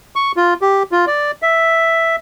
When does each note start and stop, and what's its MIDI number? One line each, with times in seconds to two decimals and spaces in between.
0.16 0.32 85
0.37 0.54 65
0.62 0.83 67
0.92 1.05 65
1.07 1.31 74
1.42 2.16 76